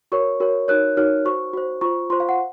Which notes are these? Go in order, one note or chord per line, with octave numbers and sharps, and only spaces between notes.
F#4 A#4 C#5 C#6
F#4 A#4 C#5
D#4 F#4 A#4 C#5 F#6
D#4 F#4 A#4 C#5 F6
F#4 C5 C#6
F#4 C5
F4 C5 C#6
F4 C5 C6
F5
F#5